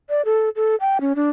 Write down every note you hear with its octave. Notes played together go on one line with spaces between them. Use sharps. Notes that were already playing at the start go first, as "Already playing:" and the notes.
D5
A4
A4
G5
C#4
D4